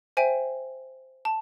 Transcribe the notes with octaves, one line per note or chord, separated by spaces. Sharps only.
C5 E5 G5 G#5
A5